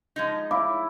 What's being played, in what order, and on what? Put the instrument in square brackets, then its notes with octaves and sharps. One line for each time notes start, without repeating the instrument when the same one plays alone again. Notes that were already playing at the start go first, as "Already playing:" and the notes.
[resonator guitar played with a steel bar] F3 G#3 D#4
[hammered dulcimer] E4 [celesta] F5 D6